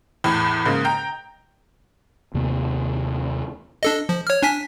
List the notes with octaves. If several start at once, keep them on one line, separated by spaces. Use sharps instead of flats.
E2 A2
G#2 C#3 A#3
G5 A#5
D#2 C3 A3 B3
D4 A4 D#5
F3
C#5 F6
D4 G#5 B6